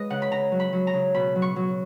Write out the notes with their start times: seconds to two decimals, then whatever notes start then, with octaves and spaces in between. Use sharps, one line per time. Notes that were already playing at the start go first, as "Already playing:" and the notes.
Already playing: G#3 B4 D#5
0.10 C#3 F#5
0.22 B5
0.31 C#3 A#5
0.51 F#3
0.60 B5
0.73 F#3
0.87 A#5
0.94 C#3
1.14 B2 B5
1.35 F#3
1.42 C#6
1.56 F#3